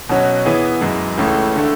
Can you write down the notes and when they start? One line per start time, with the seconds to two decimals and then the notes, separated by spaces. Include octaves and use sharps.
0.09 B2 F#3 C#4 F#4
0.46 E3 B3 E4 G#4
0.81 F#2 E3 G#3
1.17 C#2 C#3 E3 A3
1.56 D3 A3